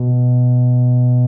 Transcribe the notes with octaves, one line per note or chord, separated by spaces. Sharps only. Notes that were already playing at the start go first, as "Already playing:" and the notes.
Already playing: B2